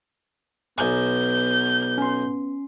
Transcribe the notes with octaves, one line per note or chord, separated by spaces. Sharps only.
B1 B3 G#5 G6
C#4 C6